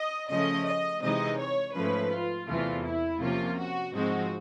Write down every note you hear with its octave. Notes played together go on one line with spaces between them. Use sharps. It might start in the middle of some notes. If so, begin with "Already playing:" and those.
Already playing: D#5
C#3 F3 A3 C#4 D#5
D#5
C3 E3 G#3 C4 D#4 D#5
C#5
G#2 F3 A3 C#4 B4
F4
E2 C3 E3 A3 F4
E4
C3 F3 A#3 C#4 F4
F#4
G#2 F3 G#3 C4 D#4 F#4